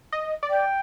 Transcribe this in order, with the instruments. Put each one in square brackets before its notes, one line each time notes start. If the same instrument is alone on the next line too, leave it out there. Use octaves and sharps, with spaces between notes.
[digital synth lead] D#5
D5
[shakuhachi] G5